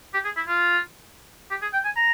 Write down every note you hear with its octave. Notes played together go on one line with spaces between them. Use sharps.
G4
G#4
E4
F4
G4
G#4
G5
G#5
A#5